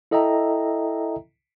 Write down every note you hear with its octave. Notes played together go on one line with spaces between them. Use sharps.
E4 A4 D#5 E5 G5 A#5